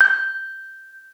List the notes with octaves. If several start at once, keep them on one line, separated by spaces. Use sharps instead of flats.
G6